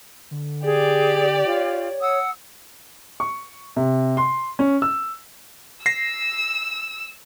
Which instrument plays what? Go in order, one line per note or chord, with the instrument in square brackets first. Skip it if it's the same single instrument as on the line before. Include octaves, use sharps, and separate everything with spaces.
[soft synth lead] D3
[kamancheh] G4 D5 [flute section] G#4
[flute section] F4 [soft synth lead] C#5
[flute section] F#5 D#6 E6
[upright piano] C#6
C3
C6
C#4
E6
[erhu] E6 [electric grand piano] A#6 C7